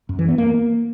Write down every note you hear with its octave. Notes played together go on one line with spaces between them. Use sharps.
F#2
E3
B3
A#3